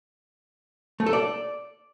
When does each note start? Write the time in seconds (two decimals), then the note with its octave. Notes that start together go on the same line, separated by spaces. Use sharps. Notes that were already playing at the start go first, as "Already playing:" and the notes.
1.00 A3
1.06 A4
1.13 D5